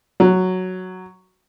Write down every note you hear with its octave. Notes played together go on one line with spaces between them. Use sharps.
F#3